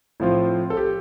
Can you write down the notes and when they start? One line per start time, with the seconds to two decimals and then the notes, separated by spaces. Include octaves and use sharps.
0.20 A2 F3 C4 F4
0.70 A4
0.77 G4